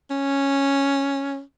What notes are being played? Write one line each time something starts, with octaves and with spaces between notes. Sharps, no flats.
C#4